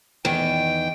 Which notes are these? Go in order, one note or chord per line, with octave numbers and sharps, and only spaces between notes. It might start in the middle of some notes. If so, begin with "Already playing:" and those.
E2 D#3 G5